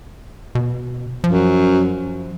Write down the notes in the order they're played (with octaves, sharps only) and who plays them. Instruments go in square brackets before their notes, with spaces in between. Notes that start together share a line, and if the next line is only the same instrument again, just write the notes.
[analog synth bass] B2
[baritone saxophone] F#2 [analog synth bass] F3